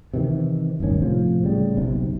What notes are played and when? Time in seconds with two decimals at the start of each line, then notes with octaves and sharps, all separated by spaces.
0.14 C3 D#3 E3
0.80 D1 G1 D#3 C#4
1.01 A2 C3 F3
1.42 A2 C#3 G3
1.77 F#1 B1 C3